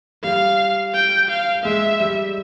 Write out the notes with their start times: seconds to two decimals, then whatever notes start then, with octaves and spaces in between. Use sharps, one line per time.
0.23 G3 F5
0.94 G5
1.30 F5
1.64 G#3 E5
2.00 G3